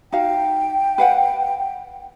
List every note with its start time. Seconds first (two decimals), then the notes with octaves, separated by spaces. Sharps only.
0.12 D#4 F#4 F5 G5
0.98 B4 F5 F#5